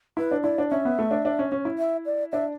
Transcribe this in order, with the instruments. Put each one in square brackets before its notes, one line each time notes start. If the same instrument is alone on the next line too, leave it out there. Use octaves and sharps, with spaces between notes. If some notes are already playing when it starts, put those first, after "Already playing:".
[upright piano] E4 [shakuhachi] B4
[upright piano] D4
[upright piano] E4 [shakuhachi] D5
[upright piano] D4
[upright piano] C#4 [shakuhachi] E5
[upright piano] B3
A3
D4
D4
C#4
C#4
E4
[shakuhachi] E5
D5
[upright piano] D4 [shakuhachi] E5